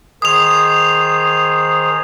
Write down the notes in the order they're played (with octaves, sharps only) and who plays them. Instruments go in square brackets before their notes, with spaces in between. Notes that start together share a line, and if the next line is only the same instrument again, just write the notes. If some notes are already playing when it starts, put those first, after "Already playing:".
[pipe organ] D#3 G#4 C5 [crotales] D#6 F7